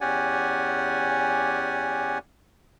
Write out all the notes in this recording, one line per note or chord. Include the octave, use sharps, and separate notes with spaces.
E2 C#4 G4 D5 F#5 G#5